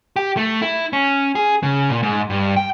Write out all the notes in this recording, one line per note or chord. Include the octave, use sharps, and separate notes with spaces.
G4
A3
E4
C#4
G#4
C#3
A#2
G#2
G2
G5